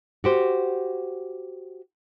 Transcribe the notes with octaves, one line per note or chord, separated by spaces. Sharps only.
F#4 G4 C5